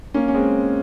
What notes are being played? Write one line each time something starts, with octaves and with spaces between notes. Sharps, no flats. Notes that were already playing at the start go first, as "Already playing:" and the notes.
A#3 C#4
C#4
G#3 C4